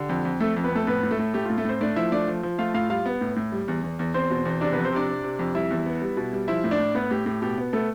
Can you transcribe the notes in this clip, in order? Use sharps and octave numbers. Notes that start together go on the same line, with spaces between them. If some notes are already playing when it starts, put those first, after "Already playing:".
Already playing: D3 G4
F2
F2
A3 A4
F2
B3 B4
F2 A3 A4
A2 B3 B4
A2
A3 A4
A2
A3 G4
A2 F4
A3 A4
A2 C4 C5
A3 D4 D5
F3 E4 E5
A3 D4 D5
F3
F3
A3 F4 F5
A2 F4 F5
G3 F4 F5
B3
A2
A2
G3
E2
E2
E2
E2 C4 C5
B2
E2
C3 D4 D5
F2 B3 B4
C4 C5
C3 D4 D5
C3
C3
F2
G3 E4 E5
E2
B3
G3
B2
G3
F3 E4 E5
A2
D4 D5
A2
A2 B3 B4
A2 G4
A2 G4
B2 G4
B3
A3 B3 A4